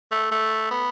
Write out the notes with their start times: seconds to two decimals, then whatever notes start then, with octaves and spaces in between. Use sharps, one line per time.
0.11 A3
0.32 A3
0.71 B3